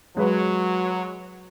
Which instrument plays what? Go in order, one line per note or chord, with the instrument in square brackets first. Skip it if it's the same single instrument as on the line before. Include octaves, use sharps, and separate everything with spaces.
[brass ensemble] F#3 [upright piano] G#3 B4